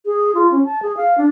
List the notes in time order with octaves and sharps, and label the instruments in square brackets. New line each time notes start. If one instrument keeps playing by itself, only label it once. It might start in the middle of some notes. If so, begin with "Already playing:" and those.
[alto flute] G#4
F4
C#4
A5
G#4
F5
D4